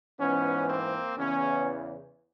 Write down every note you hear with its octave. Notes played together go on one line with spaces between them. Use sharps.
G#2 E3 B3 C#4
A#3 C4
E2 C#3 E3 B3 C#4